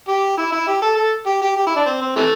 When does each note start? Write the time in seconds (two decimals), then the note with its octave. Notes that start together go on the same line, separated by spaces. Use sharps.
0.08 G4
0.37 E4
0.52 E4
0.67 G4
0.82 A4
0.97 A4
1.26 G4
1.42 G4
1.56 G4
1.66 E4
1.76 D4
1.86 C4
2.01 C4
2.16 C3 E3 A3